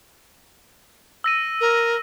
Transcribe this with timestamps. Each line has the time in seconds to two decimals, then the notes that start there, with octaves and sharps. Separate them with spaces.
1.24 E6 A#6 D#7
1.61 A#4